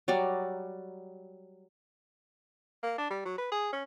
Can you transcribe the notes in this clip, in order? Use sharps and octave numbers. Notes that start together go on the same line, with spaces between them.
F#3 G3 D5 A#5
A#3
D4
G3
F#3
B4
G#4
C#4